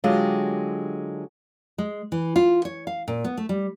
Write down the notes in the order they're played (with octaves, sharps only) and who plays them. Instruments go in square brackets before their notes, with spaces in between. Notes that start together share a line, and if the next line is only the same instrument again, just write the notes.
[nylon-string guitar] D3 F#3 G#3 F4 G4
G#3
E3
F4
C#5
F5
A#2
B3
A3
G3